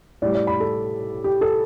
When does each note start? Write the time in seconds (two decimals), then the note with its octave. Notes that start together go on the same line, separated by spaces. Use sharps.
0.22 A2 G3 D5
0.35 D5
0.47 B5
0.60 A4
1.24 G4
1.41 A4